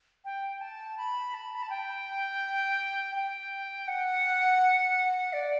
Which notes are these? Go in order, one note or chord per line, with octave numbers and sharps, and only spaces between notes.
G5
A5
B5
A5
B5
A5
G5
G5
F#5
D5